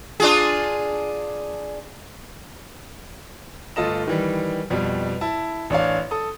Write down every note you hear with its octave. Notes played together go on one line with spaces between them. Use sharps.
D4 F4 G#4
G1 A3 F4 A4 D#5 E7
D#3 E3 G3
F2 B2 G3
E4 A5
A1 D4 C#5 F5
A4 D#6